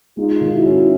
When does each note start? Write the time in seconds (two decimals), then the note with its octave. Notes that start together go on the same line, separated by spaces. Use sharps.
0.17 G#3 D#4 F4
0.41 D#3
0.54 E4 F#4
0.66 C#4